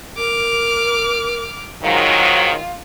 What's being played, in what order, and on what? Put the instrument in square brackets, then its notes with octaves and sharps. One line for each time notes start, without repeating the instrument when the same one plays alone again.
[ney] A#4 [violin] D6 F6
[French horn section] G#2 D#3 F#3 [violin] F4 [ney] F5